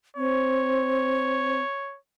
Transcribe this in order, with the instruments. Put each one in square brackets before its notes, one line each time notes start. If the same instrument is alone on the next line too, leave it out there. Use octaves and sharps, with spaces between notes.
[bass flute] C4 [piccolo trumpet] C#5